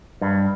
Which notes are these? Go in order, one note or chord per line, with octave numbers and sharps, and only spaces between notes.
G2